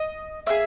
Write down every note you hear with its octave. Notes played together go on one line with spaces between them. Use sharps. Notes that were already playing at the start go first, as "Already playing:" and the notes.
Already playing: D#5
A#3 D#4 G#4 E5